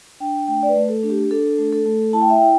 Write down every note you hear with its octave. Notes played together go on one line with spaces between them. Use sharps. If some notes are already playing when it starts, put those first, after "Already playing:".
D4 G5
A3 G5
D5
B4
A3
A4
D4
G4
D4 A4
A3
A4
A3
E4 A5
G5
E5
E4 G5